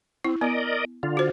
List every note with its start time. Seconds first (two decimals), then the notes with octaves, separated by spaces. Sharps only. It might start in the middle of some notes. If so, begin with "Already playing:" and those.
0.25 C4 E4
0.41 B3 A#4 D5 D#5
1.03 D3 F4
1.17 F#4 C5